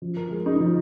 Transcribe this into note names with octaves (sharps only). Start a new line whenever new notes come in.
F3
A#4
G#3
D#4
F3